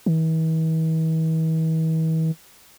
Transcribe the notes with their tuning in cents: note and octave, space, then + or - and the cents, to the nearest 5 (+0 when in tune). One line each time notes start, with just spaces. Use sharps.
E3 -45